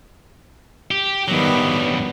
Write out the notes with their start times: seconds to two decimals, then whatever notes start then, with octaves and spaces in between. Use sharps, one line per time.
0.91 G4
1.28 G2 D#3 F#3 G3 B3